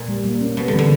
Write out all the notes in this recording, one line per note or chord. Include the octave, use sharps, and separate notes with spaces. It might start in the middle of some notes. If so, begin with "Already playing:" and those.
Already playing: A#2
G3
A#3
C#4
B2 G3
D3 E3
D3